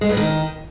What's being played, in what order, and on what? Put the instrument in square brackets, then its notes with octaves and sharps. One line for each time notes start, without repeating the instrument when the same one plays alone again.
[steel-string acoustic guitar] G#3
G2
D#3